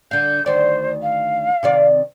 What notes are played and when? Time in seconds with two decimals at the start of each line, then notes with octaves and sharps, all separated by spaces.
0.11 D3 F5 G6
0.46 D2 D#3 C5 D5
1.02 F5
1.63 C3 D#3 D5